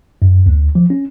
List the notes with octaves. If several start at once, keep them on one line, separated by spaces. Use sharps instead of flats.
F#2
D2
F3
C#4